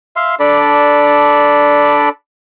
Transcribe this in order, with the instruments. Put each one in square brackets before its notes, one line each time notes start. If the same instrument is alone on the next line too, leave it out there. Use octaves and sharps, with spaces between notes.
[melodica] E5 F5 C6
D4 A4 D5 B5